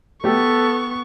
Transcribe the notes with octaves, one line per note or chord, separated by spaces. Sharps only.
A3 B3 G4 A4 C#6